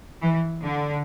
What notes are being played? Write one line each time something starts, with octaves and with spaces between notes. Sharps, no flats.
E3
D3